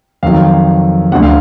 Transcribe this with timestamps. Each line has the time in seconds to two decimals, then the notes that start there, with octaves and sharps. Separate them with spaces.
0.23 F2 D#3 F#3 F5
1.12 D2 D3 F3 F#5
1.23 F5